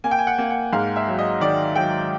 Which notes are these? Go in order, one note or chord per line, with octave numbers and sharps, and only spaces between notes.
A#3 G#5
G5
G#5
F#5
A#3
F#5
G#2 F5
E5
F#3
D#5
D#3 D5
F#3 G5